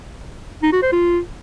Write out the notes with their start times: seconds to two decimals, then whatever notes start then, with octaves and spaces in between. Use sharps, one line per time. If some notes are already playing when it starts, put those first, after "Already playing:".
0.63 D#4
0.73 F#4
0.82 C5
0.92 F4